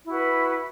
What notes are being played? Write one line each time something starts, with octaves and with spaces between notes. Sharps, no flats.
E4 F#4 B4